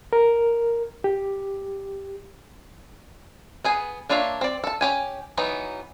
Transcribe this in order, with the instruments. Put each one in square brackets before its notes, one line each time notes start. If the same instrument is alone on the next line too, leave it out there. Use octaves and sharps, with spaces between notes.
[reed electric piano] A#4
G4
[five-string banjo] B3 G#4 G#5
A#3 D4 F4 C#5 E5
C4 D5
A4 A5
C#4 G4 G#5
E3 F#3 B3 D#4